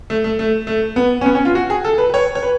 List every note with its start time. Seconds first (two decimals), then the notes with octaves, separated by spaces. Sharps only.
0.10 A3
0.24 A3
0.39 A3
0.67 A3
0.96 B3
1.21 C#4
1.26 B3
1.35 C#4
1.45 F4
1.55 F#4
1.70 G#4
1.85 A4
1.98 B4
2.10 B4
2.14 C#5
2.35 C#5
2.43 B4